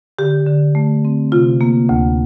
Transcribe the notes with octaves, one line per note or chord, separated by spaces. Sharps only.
D3 G4
D3
A3
C4
C3 F4
A#3
D2